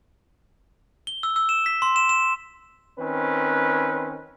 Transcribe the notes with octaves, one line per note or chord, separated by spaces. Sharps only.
G7
E6
E6
E7
B6
C6
E7
E7
D#3 C4 C#4 B4